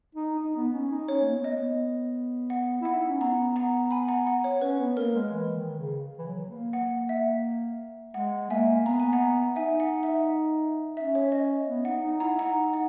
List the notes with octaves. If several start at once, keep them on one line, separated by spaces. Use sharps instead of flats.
D#4
D#4
B3
C#4
D#4
C#4 C#5
A#3
B3
D#5
B3
F#5
E4 F#5
D#4
C#4
B3 F#5 A#5
F#5 A#5
G#5 B5
F#5 A#5
F#5
C#5
C#4 B4
B3
A#3 A#4
G#3
E3
D#3
C#3
E3
F#3
A#3
F#5
E5
G#3 F#5
A#3 E5 G#5
B3 A#5
G#5
F#5 A#5
D#4 E5 G#5
F#5
E5
C#4 E5
C#5
D#5
B3
D#4 F#5
D#4
E4 F#5 A#5
D#4 F#5 A#5
F#5